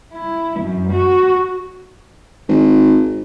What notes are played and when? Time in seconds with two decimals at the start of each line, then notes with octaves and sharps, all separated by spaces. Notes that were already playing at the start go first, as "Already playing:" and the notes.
0.12 E4
0.59 F#2
0.92 F#4
2.48 G#1